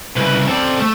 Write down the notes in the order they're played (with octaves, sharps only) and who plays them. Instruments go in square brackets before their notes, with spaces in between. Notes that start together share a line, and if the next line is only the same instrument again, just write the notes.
[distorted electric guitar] C2 C#3 [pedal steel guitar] B4
[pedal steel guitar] C4 D5 [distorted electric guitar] A4 C5
[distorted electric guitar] A3